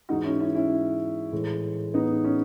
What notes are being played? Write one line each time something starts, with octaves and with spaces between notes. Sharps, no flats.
G#2 E3 G#3 D#4 F#4
C#4 E4
C#4 E4
C#4 E4
A2 E3 G#3
B3 D#4
C#4